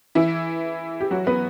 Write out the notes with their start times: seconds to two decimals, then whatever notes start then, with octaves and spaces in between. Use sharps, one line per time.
0.15 E3 E4
1.01 G4
1.11 F#3 F#4
1.27 B3 B4